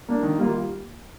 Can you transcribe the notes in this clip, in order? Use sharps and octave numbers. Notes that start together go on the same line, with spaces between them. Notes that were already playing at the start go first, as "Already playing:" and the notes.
A#3 D4
D#3
G3 A#3 F4